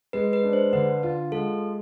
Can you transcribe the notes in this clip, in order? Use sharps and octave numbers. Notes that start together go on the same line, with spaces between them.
G#3 B4
B4
D4
C5
D3 B4
F4
G#3 A4